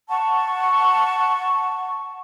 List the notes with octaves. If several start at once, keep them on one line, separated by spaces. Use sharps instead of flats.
F#5 A5 C#6